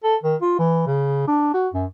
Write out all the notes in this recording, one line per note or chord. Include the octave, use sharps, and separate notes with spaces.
A4
D#3
F4
E3
C#3
D4
F#4
F#2